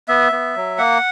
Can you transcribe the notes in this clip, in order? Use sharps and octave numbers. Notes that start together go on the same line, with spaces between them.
B3 E5
B3
F#3
A#3 F#5